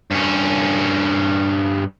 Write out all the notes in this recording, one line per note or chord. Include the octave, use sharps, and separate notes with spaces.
G2 C#4